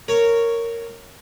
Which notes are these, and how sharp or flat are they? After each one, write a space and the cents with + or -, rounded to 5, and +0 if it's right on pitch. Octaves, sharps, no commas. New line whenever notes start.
A#4 -10 C#5 +0